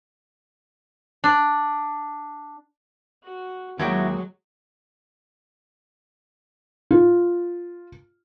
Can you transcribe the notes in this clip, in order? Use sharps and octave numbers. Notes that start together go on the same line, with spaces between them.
D4
F#4
D#2 F#3 G#3 E4 F#4 G5
F4